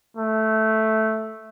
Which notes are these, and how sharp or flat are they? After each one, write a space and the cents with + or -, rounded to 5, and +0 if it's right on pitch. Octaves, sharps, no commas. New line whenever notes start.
A3 -5